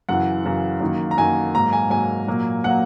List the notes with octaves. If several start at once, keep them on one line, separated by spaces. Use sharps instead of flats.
F#2 C#3 E3 F#5
F#2 C#3 E3
F#2 D#3 A#3
A#5
F#2 D#3 A#3 G#5
G#2 F#3 A#3 A#5
G#5
G#2 F#3 A#3 G#5
A#2 F#3 A#3
A#2 F#3 A#3 F#5